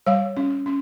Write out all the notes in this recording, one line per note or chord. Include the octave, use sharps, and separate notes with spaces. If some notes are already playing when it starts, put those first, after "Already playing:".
G3 C#5 F5
C#4
C#4